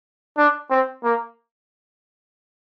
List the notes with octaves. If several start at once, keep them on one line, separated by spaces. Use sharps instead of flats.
D4
C4
A#3